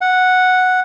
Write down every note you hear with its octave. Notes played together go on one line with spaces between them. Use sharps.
F#5